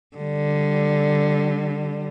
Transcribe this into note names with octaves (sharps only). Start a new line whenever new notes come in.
D3 G3